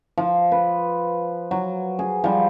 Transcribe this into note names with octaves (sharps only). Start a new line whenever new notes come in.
F3
B4
F#3
G#4
F3 G3